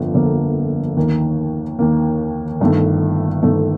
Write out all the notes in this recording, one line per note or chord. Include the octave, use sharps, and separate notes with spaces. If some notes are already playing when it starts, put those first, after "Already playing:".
Already playing: G1 F2 D3 F3 A#3
G1 F2 D3 F3 A#3
D#2 D#3 A#3
D#2 D#3 A#3
G1 G2 D#3 A3
G1 G2 D#3 A3